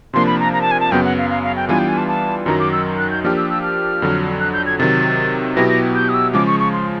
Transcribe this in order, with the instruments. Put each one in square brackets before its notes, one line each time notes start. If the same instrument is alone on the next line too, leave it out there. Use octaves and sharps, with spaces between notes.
[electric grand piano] C3 F3 A#3 D4 [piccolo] C6
[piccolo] B5
A#5
A#5
A5
G#5
A5
[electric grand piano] F#2 C#3 F#3 B3 [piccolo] G5
[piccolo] F#5
F5
F5
F5
G5
[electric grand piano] E3 G3 B3 D4 F4 [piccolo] G#5
[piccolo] G5
G#5
A5
A5
[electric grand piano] F#2 D#3 F#3 [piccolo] A#5
[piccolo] D6
E6
F#6
G6
[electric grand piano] F3 A#3 D4 G4 [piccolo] F6
[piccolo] E6
E6
F6
[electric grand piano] F2 D3 F#3
[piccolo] F#6
G6
G#6
[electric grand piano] C3 D#3 F#3 [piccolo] A6
[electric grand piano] B2 F#3 B3 E4 G4 [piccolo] A#6
[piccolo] A#6
G6
D#6
E6
[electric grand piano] C#3 F3 G#3 [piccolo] D6
[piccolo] C#6
C#6
C6